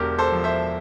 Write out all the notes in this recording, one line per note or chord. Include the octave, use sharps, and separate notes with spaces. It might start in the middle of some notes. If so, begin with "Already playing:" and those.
Already playing: E1 D3 G4 A#4
A4 C5
F3
C5 E5